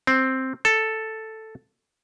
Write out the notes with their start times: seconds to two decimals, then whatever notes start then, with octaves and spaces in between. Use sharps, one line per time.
0.07 C4
0.65 A4